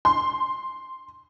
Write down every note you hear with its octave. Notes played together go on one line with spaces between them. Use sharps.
C6